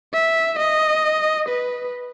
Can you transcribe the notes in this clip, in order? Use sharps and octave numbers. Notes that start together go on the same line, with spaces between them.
E5
D#5
B4